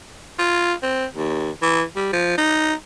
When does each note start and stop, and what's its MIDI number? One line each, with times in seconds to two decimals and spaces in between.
0.39 0.74 65
0.83 1.06 60
1.16 1.50 39
1.62 1.83 52
1.96 2.12 55
2.13 2.37 53
2.38 2.74 63